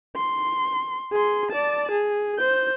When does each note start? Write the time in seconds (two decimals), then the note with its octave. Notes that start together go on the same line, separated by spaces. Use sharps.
0.16 C6
1.13 G#4 C6
1.51 D5 A5
1.91 G#4
2.38 C5 G6